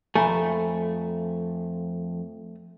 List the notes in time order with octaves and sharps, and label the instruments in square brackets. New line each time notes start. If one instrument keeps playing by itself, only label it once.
[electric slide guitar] F2 [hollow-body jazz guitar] A3 [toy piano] G#5 A#5 B5